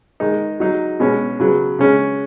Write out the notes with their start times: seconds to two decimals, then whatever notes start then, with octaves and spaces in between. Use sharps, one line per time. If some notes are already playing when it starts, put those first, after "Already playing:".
0.20 D#3 G#3 D#4
0.60 F#3 D#4
1.00 B2 G#3 C#4
1.40 C#3 F#3 B3
1.79 C#3 G#3 C#4